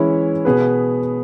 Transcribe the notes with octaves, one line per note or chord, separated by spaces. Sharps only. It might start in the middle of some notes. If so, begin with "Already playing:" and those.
Already playing: E3 G#3 C#4 E4 C#5
B2 B3 G#4 B4